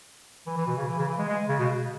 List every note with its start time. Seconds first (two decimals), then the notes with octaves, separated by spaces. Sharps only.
0.47 E3
0.57 E3
0.67 B2
0.77 C#3
0.87 E3
0.98 C#3
1.08 E3
1.18 G#3
1.28 G#3
1.48 C#3
1.59 B2